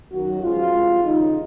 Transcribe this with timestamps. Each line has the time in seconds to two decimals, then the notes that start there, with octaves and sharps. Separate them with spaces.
0.11 F#2 D#3 F#3 F#4
0.42 F#2 F3 G#3 F4
0.72 C2 C3 F3 G#3
1.03 D#2 C#3 G#3 D#4